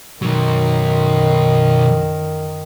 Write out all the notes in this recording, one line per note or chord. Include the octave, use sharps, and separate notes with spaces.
B1 F#2 D#3 F#3